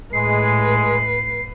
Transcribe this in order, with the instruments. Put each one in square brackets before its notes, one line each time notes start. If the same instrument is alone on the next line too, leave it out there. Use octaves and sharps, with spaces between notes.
[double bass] A2 [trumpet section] G#3 [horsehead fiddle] B4 [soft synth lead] C7